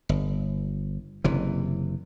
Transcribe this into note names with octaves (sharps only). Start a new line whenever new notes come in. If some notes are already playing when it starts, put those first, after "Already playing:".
G1
F#1 C3 E3